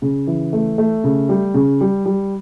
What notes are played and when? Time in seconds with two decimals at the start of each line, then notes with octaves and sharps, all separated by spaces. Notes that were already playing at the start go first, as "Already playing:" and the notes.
0.02 C#3
0.27 E3
0.53 A3
0.78 A3
1.04 C#3
1.29 G3
1.54 C#3
1.81 G3
2.06 G3